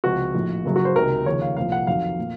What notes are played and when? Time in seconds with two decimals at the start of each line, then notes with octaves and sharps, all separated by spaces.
0.04 C#2 C3 F3 F#4
0.34 A#1 A2 F3
0.65 F#1 F#2 C#3 F#3
0.76 F#4
0.85 C5
0.96 C#2 C3 D#3 F#3 A#4
1.26 D#2 C#3 F3 C#5
1.42 F5
1.57 C2 A#2 F3 F5
1.72 F#5
1.87 F2 D#3 F#3 F5
2.19 A#2